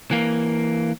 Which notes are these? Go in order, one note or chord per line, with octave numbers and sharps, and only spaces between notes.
E3 A#3